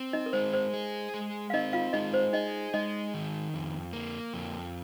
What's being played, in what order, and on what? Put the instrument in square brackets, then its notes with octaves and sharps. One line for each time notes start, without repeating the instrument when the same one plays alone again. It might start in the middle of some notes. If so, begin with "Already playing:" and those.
Already playing: [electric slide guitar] C4
[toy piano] D#4 D#5
A#4
[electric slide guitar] G#3 [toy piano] C5
[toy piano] C5
[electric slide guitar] G#4
G#3
[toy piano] F5
[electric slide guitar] C4 [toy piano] D#4 D#5
[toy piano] F4 F5
[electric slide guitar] G#3 [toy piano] D#4 D#5
[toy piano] C5
[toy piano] D#4 D#5 [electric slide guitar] G#4
[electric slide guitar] G#3 [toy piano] D#4 D#5
[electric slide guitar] D#3
F2
A#3
F2